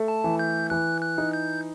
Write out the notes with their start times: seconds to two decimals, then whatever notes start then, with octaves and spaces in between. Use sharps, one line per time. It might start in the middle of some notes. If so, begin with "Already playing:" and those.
Already playing: A3
0.08 A5
0.24 E3
0.39 G6
0.70 E3 F#6
1.02 F#6
1.18 D#4
1.33 G6